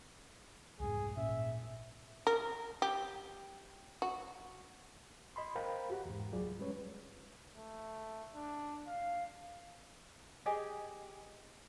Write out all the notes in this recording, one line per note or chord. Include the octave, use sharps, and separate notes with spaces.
C2 F2 G#2 G#4
G#1 A#2 C#4 E5
A#4
G4
F#4
D#5 B5 C6
A#4 C5 F5 G5 A#5 B5
F#4 G4 F#5
E2 G#2
C#2 F#3 F4 G#4 D5
G3 G#3 C#4 B4 C#5
A3
D4
F5
G4 G#4 D#5 G#5